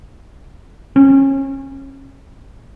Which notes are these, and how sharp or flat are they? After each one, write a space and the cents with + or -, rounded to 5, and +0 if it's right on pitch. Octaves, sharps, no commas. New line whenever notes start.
C#4 -30